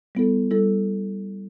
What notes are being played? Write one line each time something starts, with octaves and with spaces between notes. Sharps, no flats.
G3 B3 E4 A4
G3 B3 E4 A4